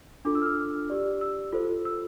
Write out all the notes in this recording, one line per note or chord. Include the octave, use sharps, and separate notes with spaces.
D4 F4 A4 D6
E6
F6
E6
G4 D5
E6
F4 A4 C5
E6